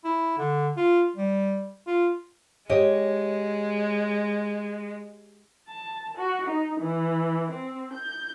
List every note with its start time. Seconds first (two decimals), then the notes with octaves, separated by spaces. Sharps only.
0.05 E4
0.38 D3
0.77 F4
1.16 G3
1.87 F4
2.69 G#3 G4 C#5 D#5
5.68 A5
6.16 F#4
6.47 D#4
6.79 E3
7.50 C4
7.92 G6